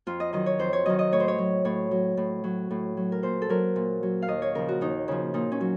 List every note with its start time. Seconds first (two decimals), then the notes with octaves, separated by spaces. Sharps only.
0.07 F2 F4
0.20 D#5
0.33 D#3 F#3 D#5
0.46 C#5
0.59 F2 C5
0.73 C#5
0.86 D#3 F#3 D#5
0.99 D#5
1.12 A2 C#5
1.20 C5
1.28 C#5
1.38 F#3
1.65 A2 C#5
1.91 F#3
2.17 A2
2.44 F#3
2.71 A2
2.97 F#3
3.12 A#4
3.23 A#2 C5
3.42 A4
3.49 F#3 A#4
3.76 A#2
4.03 F#3
4.22 F5
4.28 D#2 D#5
4.42 C#5
4.55 C#3 F3 A#4
4.68 F#4
4.81 D#2 D#4
5.08 C#3 F3
5.34 A#2 D#4
5.52 C#4
5.61 F#3